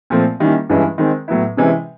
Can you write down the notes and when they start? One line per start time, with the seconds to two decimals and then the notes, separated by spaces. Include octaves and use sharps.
0.10 A#2 F3 A3 C4
0.40 D#3 G3 A#3 C#4 E4
0.69 G2 E3 G#3 C#4 E4
0.98 D#3 G#3 C4
1.28 A2 F#3 B3 E4
1.57 C3 E3 G#3 C#4